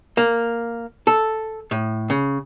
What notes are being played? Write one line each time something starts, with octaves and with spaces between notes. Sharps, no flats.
A#3
A4
A2
C#3